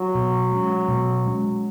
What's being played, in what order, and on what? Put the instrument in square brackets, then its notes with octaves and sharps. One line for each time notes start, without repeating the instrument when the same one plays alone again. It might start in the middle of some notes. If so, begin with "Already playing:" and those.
Already playing: [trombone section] F#3
[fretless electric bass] B2
G#3 C#4
B2
G#3 C#4